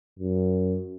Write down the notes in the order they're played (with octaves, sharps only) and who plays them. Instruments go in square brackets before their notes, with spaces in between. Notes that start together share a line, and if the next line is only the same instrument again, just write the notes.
[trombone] F#2